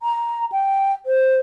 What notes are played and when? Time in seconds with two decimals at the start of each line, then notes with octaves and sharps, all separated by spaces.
0.03 A#5
0.52 G5
1.06 C5